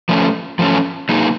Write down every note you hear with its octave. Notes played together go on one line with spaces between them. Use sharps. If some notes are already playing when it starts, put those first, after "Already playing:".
F3 A3 C#4
F3 A3 C#4
F#3 A#3 D#4 G#4